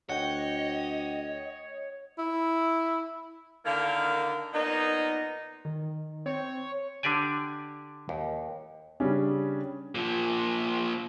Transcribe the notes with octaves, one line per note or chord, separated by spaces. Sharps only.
D2 C#5 D#5 F#5 G5
E4
D3 D#3 A#3 E4 A#4 F5
A#2 A#3 B3 D#4
D#3
C4 C#5
D3 D4 G4 D5 G#5
D#2
C#3 G3 C#4 D4
A#2 F3